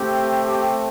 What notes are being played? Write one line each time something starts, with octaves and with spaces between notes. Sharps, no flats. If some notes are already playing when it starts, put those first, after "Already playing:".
Already playing: A3 C4 G4
G4